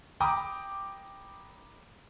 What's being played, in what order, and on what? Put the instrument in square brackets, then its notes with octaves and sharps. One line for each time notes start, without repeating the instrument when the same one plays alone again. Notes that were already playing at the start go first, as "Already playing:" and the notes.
[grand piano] G5 A#5 B5 D6 D#6